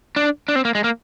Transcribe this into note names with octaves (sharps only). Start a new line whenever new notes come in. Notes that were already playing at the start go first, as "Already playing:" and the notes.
D4
D4
C4
A#3
G#3
A#3